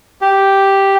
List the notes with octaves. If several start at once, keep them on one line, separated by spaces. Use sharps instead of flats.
G4